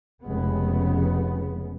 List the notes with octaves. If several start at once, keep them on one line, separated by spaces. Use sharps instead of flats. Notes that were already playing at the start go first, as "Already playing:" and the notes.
F1 F2 C#3 G#3 B3